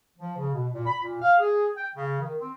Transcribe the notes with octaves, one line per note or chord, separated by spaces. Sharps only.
F3
C#3
B2
A#2
B5
A#2
F5
G#4
G5
C#3
D#3
C4